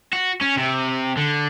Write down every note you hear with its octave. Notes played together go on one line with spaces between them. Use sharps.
F#4
C#4
C3
D3